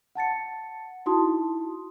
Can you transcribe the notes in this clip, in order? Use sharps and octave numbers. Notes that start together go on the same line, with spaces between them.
F#5 A5 A6 C#7
D#4 E4 F#4 A5 C6 D#6